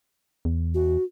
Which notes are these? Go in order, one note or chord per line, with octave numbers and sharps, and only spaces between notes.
E2
F#4